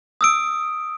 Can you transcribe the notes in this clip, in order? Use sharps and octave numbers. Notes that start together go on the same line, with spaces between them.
D#6 E6 D7